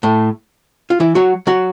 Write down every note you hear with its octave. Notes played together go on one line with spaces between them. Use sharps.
A2 A3
F4
E3 E4
F#3 F#4
F#3 F#4